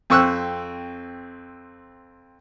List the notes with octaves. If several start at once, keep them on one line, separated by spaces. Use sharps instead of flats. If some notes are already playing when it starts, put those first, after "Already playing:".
F2 C4 C#6 E6 F#6